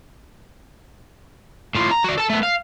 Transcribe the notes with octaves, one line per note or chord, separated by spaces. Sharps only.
A2 F4
A#5
F#4 D5
A4 A5
A3 B3
F5